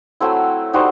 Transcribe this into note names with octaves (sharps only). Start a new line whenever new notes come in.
F#3 A3 C4 E4
G3 D#4 F#4 C5